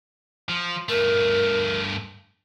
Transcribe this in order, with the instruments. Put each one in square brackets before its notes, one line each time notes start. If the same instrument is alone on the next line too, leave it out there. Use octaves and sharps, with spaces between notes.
[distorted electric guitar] F3
[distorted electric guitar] G2 A3 [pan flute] A#4